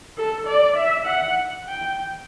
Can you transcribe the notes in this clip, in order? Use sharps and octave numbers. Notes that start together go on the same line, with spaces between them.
A4
D5
E5
F#5
G5